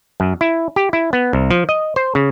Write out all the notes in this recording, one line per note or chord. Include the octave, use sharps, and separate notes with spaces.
F#2
E4
G4
E4
B3
C2
F3
D#5
C5
C#3